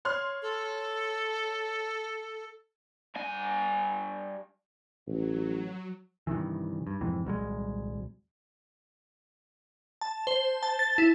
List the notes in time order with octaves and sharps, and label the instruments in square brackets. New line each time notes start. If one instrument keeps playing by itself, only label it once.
[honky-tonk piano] C#5 C6 F6
[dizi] A4
[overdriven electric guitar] G2 G#5
[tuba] A1 [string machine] F#3
[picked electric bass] G2 C3 D#3 E3
G2
F2 G#2 C3 E3
D#1 C2 F#3 G#3
[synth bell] A5
C5
A5
A6
E4